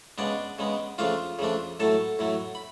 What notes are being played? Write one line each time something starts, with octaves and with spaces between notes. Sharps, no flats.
C#3 G#3 B3 D4 D5
C#3 G#3 B3
C#3 F3 A3 D4 F4 F5
C#3 F3 A3 D4
A2 F#3 A3 A4 A5
A2 F#3 A3
B5